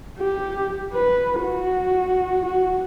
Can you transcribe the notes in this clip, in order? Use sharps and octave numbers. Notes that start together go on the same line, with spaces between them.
G4
B4
F#4
F#4